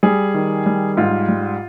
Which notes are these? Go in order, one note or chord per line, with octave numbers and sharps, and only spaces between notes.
G3 G#4
D#3
G3
G#2 F4
G3